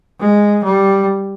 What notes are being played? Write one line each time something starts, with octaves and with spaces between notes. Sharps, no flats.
G#3
G3